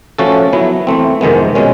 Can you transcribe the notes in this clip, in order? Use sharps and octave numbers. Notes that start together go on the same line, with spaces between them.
F3 A3 C#4 F#4 A4
F#3 B3 E4
E3 A3 C4
F2 C3 D#3 G#3 B3
B2 G#3 C#4